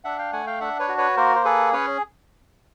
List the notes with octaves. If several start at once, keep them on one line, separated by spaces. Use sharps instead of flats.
D4 E5 F#5
F5 G5
A3 F#5 G#5
F5 G5
D4 E5 F#5
B4 C#5
F#4
B4 C#5
A#3 A#4 C5
C5
G#4 A4 B4
C#4 B4 C#5